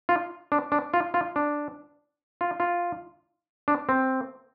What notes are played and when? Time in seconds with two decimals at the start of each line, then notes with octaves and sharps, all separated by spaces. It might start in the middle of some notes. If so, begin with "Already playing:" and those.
0.09 F4
0.52 D4
0.72 D4
0.94 F4
1.14 F4
1.36 D4
2.41 F4
2.60 F4
3.68 D4
3.89 C4